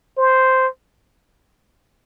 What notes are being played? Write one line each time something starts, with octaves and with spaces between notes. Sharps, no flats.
C5